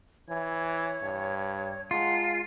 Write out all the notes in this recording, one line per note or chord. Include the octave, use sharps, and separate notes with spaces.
E3 C#5 G#6
G2
G#3 F4 F#5 A5 A#5